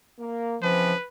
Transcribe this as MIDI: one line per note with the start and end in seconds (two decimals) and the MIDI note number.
0.19 0.57 58
0.62 0.92 49
0.62 0.92 52
0.62 0.93 53
0.62 0.92 60
0.62 1.08 71